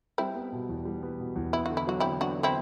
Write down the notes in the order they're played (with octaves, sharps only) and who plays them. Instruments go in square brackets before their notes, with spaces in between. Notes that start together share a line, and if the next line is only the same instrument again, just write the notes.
[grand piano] G3 [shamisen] C4 E4
[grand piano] B3
B2
E2
G3
B3
B2
E2
[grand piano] B3 [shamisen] E4
[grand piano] D3 [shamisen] F#4
[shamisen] E4
[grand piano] F#3 [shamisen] F#4
[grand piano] D3 [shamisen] C4 E4
[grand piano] B3 [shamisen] D4 F#4
[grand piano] D3
[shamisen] C4 E4